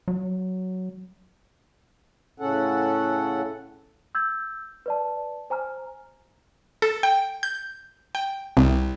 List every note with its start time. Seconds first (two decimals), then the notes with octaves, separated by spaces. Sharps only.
0.08 F#3
2.40 A2 C#3 C#4 A4 F#5
4.15 E6 G6 G#6
4.86 B4 D5 A5
5.50 C5 G#5 A#5 F6
6.82 A4
7.03 G5
7.43 G6
8.15 G5
8.57 C2